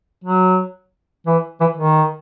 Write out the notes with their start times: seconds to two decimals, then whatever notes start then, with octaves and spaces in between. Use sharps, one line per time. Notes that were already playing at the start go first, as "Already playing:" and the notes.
0.24 F#3
1.27 E3
1.60 E3
1.77 D#3